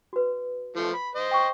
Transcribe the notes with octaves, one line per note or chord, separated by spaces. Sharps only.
F#4 B4
F3 A3
B5
C5 D#5
G5 C#6